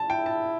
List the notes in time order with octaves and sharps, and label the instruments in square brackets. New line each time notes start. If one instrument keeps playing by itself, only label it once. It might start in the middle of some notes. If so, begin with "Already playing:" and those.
Already playing: [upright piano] A5
[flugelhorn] E4 [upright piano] G5
[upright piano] A5